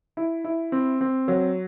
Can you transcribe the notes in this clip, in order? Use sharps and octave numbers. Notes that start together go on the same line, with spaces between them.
E4
E4
C4
C4
F#3